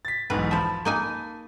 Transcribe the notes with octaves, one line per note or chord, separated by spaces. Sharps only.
A6 B6
B1 E2 G#2 B4
F3 E5 A5 B5
A#3 D#4 G#5